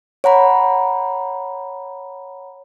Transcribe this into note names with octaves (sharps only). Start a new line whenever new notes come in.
C#5 F#5 A#5 B5